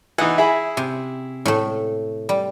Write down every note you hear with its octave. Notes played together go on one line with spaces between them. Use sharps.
E3 D#4 F#5
E4 G#4 B5
C3
A2 A3
G3